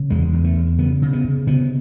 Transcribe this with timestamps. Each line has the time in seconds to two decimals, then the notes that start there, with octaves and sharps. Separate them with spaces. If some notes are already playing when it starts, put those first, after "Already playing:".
Already playing: C#3
0.10 E2 G#3
0.33 E2
0.44 A3
0.56 E2
0.78 C#3 B3
1.02 C#3
1.13 B3
1.24 C#3
1.47 C#3 B3